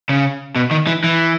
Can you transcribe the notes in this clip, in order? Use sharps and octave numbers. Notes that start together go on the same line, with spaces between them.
C#3
B2
D#3
E3
E3